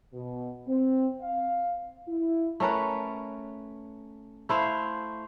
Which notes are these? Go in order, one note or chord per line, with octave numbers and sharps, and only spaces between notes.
B2
C4
F5
E4
A3 C#4 A#4 B4
A3 E4 C5 F5